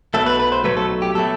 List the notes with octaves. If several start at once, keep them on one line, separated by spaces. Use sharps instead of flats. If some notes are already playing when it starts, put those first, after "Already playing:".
B1 B2 F#3 A3 A4
B4
B4
C5
B1 B2 F#3 A3 B4
A4
G4
B2 F#3 A3 A4